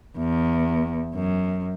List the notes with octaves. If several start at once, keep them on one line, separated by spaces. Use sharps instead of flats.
E2
F#2